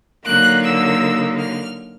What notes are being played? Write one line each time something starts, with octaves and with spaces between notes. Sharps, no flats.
D3 F#3 A#3 D#4 F#6
E6
F6